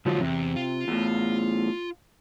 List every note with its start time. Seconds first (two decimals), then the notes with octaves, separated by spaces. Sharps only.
0.06 D2 G#2 F3 F#3 F4
0.21 E2 C3
0.56 F4
0.88 E2 A2